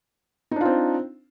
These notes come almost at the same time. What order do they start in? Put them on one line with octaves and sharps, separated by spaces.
D#4 D4 F4 C4